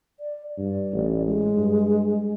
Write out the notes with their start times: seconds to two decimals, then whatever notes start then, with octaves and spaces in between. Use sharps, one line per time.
0.20 D5
0.58 G2 D5
0.93 A1
1.25 G#3
1.57 G2